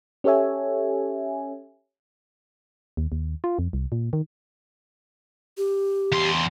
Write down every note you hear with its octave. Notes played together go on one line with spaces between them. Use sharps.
C#4 G4 A4 C#5 E5 G#5
D#2
D#2
F4
F2
C2
A#2
D#3
G4
E2 C6